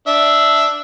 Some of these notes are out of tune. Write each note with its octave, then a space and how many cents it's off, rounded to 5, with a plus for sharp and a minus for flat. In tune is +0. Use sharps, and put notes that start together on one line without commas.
D4 +0 E5 +0